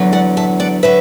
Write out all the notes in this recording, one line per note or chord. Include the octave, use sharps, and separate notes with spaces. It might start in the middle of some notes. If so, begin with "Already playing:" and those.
Already playing: E2 D3 F#3
D5 F#5
E5 A5
D5 F#5
D3 F#3 B4 E5